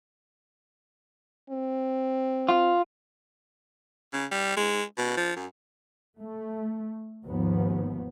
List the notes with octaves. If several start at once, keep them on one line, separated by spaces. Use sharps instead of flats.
C4
F4
C#3
G3
G#3
B2
F3
F#2
A3
G#1 D#2 F3 B3